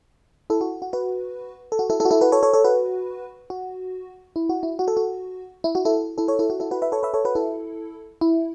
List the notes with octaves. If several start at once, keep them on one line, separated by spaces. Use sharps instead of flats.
E4 A4
F#4
F#4
F#4 B4
A4
F#4
E4 A4
E4 A4
F#4
E4 A4
F#4 B4
A4 C#5
A4 C#5
A4 C#5
F#4 B4
F#4
E4
F#4
E4
F#4
A4
F#4
E4
F#4
E4 A4
E4 A4
A4 C#5
E4 A4
F#4
E4 A4
F#4 B4
B4 E5
A4 C#5
B4 E5
A4 C#5
F#4 B4
E4 A4
E4